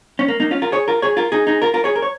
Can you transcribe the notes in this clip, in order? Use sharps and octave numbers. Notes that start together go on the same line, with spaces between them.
C#4
A#3
A#3 D#4
C#4 F4
F4 A#4
G#4 C#5
F4 A#4
G#4 C#5
F4 A#4
D#4 G#4
D#4 G#4
F4 A#4
F4 A#4
G#4 C#5
A#4
C#5